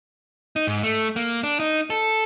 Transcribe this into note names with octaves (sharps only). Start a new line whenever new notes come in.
D#4
G#2
A3
A#3
D4
D#4
A4